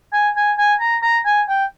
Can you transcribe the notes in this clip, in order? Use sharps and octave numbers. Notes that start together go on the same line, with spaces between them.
G#5
G#5
G#5
A#5
A#5
G#5
G5